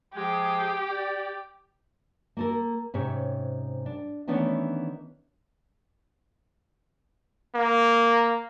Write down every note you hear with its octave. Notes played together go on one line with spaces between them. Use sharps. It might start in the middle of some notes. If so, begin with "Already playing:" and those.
F3 G#3 G4 G#4
D5
A#3 A4 A#4
G#2 C3 C#4 C#5
D4
D#3 E3 A3 B3 C#4 D4
A#3